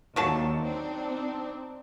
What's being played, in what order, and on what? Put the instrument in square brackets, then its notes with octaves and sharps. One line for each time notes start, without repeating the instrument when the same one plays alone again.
[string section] D#2 [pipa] D3 F#3 A5 [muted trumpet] D#4
[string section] C4 D4